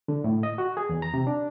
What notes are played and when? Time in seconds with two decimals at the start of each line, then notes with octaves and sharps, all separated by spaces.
0.08 D3
0.24 A2
0.43 D#5
0.58 F#4
0.77 G#4
0.89 E2
1.02 A#5
1.14 C3
1.27 D4